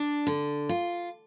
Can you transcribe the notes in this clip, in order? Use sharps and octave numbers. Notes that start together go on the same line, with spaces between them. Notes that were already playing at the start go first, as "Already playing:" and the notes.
Already playing: D4
D3
F4